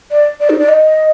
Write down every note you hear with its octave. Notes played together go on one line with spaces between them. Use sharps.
D5
D5
D#4
D5
D#5